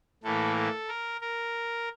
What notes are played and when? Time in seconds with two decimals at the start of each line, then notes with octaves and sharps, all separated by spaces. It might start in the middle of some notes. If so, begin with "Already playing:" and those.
0.24 A2 E3 A#3 A4
0.56 A4
0.88 A#4
1.21 A#4